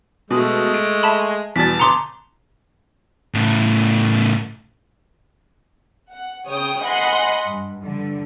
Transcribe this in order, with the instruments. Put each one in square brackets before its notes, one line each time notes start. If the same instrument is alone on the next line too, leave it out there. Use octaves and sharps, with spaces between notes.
[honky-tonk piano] B2 D#6 [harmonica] G#3 A3
[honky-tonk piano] D7
[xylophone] E5 A5 B5
[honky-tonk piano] E2 B2 G3 [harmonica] A5 [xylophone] A6 B6
[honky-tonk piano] G1 D#6 C#7 [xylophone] A#5 C6 D6
[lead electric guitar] A2 C#3
[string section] F#5
C#3 C#5 G5 D#6
D#5 F#5 G#5 B5 C6
G2
G2 D3